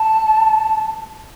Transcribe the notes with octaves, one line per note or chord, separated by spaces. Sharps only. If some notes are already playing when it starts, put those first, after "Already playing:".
Already playing: A5